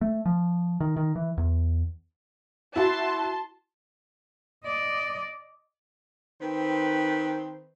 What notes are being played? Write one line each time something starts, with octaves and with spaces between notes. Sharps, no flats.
A3
F3
D#3
D#3
E3
E2
E4 F#4 A5 C6
D5 D#5
D#3 C4 B4 C5